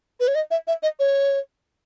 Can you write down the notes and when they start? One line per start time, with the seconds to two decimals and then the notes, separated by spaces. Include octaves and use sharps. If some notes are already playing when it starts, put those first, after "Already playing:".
0.20 B4
0.28 C#5
0.35 D#5
0.51 E5
0.67 E5
0.83 D#5
0.99 C#5